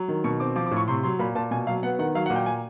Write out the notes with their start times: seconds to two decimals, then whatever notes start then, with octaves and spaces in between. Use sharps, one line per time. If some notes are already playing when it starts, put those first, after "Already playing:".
Already playing: F#3
0.08 D#3
0.24 B2 C#6
0.40 C4 D6
0.56 F3 D6
0.66 D6
0.71 A2
0.77 C#6
0.88 C3 C6
1.03 F#3 C6
1.19 A#2 B5
1.35 A#2 A5
1.51 B2 G#5
1.67 F#3 F5
1.83 B3 F#5
1.99 D#3 F#5
2.15 F#3 F5
2.26 F#5
2.30 A#2
2.36 G5
2.46 G#5